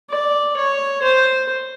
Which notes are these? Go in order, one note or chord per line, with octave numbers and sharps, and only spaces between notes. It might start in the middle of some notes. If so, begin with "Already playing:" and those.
D5
C#5
C5